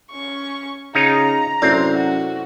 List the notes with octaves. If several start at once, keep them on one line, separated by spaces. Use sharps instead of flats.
C#4 C#6
C#3 D#4 F4 C#5 A#5
F#2 A2 C3 C4 D4
F#4